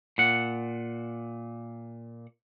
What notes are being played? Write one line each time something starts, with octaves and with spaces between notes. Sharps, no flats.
A#2 F#5